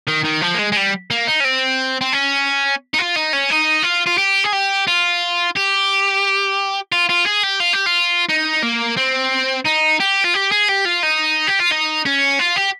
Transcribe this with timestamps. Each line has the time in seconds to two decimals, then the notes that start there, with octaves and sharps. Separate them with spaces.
0.08 D#3
0.25 D#3
0.42 F3
0.55 A#3
0.59 G#3
0.72 G#3
0.77 G3
1.11 A#3
1.28 D#4
1.40 C#4
1.45 C4
2.01 C4
2.13 C#4
2.94 D#4
2.98 F4
3.16 D#4
3.33 C#4
3.51 D#4
3.84 F4
4.07 F4
4.18 G4
4.44 G#4
4.53 G4
4.87 F4
5.56 G4
6.92 F4
7.09 F4
7.26 G#4
7.43 G4
7.60 F4
7.73 G4
7.86 F4
8.29 D#4
8.63 A#3
8.97 C4
9.66 D#4
10.00 G4
10.24 F4
10.34 G4
10.51 G#4
10.68 G4
10.85 F4
11.03 D#4
11.47 G4
11.59 F4
11.71 D#4
12.05 C#4
12.39 F4
12.56 G4